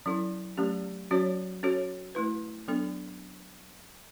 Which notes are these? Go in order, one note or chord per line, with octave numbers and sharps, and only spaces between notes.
F#3 C#4 E4 A4
F#3 A3 C#4 G4
F#3 C#4 F#4 C#5
C#4 F#4 A4 C#5
A3 E4 B4
F#3 B3 D4 A4